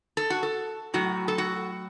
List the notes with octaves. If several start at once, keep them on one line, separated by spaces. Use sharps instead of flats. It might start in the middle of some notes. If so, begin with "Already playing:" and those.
A4
F#4
A4
A2 F#3 F#4
A4
F#4